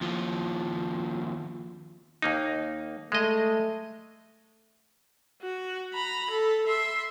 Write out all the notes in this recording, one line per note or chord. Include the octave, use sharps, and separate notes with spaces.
D#2 F3
D#2 A#3 D#4
G#3 A3 D#5
F#4
A#5 B5
A4
E5 C6